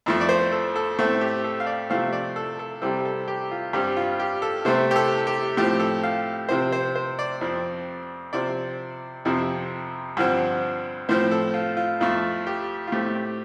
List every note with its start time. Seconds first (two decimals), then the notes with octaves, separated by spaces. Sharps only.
0.06 F2 F3 A3
0.21 D5
0.29 C5
0.52 A4
0.76 A4
0.99 A2 A3 C4 A4
1.21 G4
1.44 A4
1.60 F5
1.66 D5
1.90 C3 F3 A3 C4 F5
2.13 D5
2.36 A4
2.59 A4
2.82 C3 G3 C4 A4
3.05 A4
3.28 G4
3.51 F4
3.73 G2 G3 C4 G4
3.97 F4
4.19 G4
4.42 A4
4.65 C3 A3 C4 C5
4.91 G4
4.96 A4
5.27 G4
5.57 A2 F3 C4 G4
5.80 A4
6.03 F5
6.49 C3 F3 C4 C5
6.72 C5
6.95 C5
7.19 D5
7.41 F2 F3 C4
8.33 C3 F3 C4 D5
9.25 F2 C3 F3 C4
10.17 G2 D3 F3 C4
11.09 A2 F3 C4 C5
11.31 A4
11.54 F4
11.77 F4
12.00 F2 F3 A3 F4
12.47 G4
12.87 F4
12.92 A2 A3 C4 G4
13.15 G4